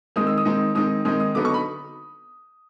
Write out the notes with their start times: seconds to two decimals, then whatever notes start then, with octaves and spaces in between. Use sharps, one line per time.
0.16 D#3 G#3 C4 D#4 D#6
0.27 E6
0.38 D#6
0.45 D#3 G#3 C4 D#4
0.75 D#3 G#3 C4 D#4 D#6
1.05 D#3 G#3 C4 D#4 D#6
1.20 D#6
1.34 D3 F#3 B3 D#4 D6
1.45 C#6
1.54 B5